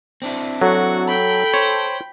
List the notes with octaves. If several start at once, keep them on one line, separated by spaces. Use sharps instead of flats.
C4 D4 E4
F#3 F#4 A4
G5 B5
C5 C#5